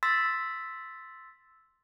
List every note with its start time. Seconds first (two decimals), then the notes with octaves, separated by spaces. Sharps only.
0.03 C6 E6 A6 B6